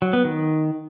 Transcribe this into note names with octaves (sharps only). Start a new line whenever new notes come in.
F#3
B3
D#3